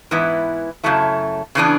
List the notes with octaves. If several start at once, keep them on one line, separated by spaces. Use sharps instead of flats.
G#2 E3 B3 E4
F#2 C#3 F#3 A3 E4
C#3 E3 B3 D4